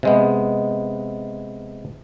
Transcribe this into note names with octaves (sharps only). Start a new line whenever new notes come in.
C3 G#3 B3